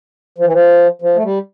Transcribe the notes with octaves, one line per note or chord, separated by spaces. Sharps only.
F3
E3
F3
F3
A3
G3